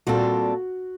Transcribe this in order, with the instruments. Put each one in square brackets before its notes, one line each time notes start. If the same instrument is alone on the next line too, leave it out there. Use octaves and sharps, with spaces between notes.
[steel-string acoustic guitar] A#2 G3 C4 F4 A4 [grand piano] F#4